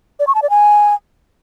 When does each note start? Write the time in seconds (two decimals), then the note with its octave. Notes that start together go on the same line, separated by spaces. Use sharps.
0.20 D5
0.27 C#6
0.35 A5
0.42 D5
0.50 G#5